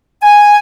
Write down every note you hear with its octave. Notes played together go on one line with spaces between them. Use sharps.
G#5